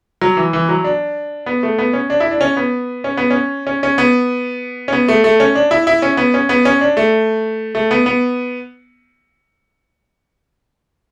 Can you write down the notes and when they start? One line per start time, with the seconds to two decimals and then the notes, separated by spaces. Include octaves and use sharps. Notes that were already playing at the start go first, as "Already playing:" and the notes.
0.22 F#3
0.37 E3
0.53 E3
0.69 F#3
0.84 D4
1.46 B3
1.63 A3
1.78 B3
1.93 C#4
2.10 D4
2.20 E4
2.31 D4
2.41 C#4
2.57 B3
3.04 C#4
3.17 B3
3.30 C#4
3.67 C#4
3.83 C#4
3.98 B3
4.88 C#4
4.93 B3
5.08 A3
5.24 A3
5.40 C#4
5.55 D4
5.71 E4
5.87 E4
6.02 C#4
6.17 B3
6.34 C#4
6.49 B3
6.65 C#4
6.81 D4
6.97 A3
7.75 A3
7.91 B3
8.06 B3